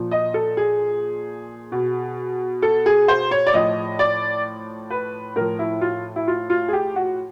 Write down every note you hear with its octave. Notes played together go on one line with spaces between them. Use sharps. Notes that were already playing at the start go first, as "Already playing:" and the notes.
Already playing: A#2 F3
D#5
A4
G#4
B2
A4
G#4
C5
C#5
D5
A2 F3 D#5
D5
B4
A2 F3 A#4
E4
F4
E4
F4
F4
G#4
G4
F#4